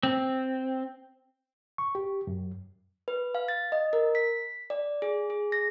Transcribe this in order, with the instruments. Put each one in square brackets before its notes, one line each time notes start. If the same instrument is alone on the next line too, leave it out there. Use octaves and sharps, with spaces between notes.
[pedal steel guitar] C4
[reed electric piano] C#6
G4
F#2
[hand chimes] B4
F5
A6
D#5
A#4
B6
D5
G#4
G#4
A#6